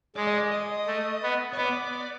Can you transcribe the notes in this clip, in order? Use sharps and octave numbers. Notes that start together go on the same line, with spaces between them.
G#3 D5
D#5
D5
D#5
A3
B3
C#5
B3 D5